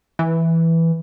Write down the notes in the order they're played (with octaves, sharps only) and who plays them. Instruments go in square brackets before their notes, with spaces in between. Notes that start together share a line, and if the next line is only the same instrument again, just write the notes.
[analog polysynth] E3